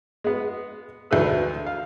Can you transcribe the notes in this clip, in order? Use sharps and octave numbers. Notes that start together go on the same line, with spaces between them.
G#3 B3
D2 E3 G#3 B4 E6
F5